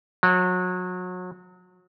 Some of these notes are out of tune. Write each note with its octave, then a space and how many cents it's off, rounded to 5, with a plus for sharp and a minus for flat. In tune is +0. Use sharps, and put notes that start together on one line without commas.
F#3 -30